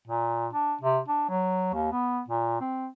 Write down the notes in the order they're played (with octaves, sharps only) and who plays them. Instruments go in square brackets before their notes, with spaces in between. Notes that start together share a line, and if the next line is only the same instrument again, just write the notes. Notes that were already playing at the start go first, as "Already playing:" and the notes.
[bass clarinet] A#2
D4
C3
D4
F#3
D#2
B3
A#2
C4